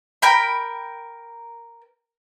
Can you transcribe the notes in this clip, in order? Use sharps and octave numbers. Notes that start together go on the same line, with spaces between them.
A#4 G5 B5